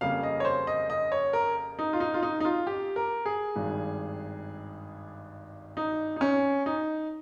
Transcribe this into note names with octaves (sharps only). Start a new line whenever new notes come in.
F2 C#3 G3 A#3 F5
D#5
C#5
C5
D#5
D#5
C#5
A#4
D#4
F4
D#4
F4
D#4
D#4
F4
G4
A#4
G#4
G#1 G2 D#3
D#4
D#4
C#4
D#4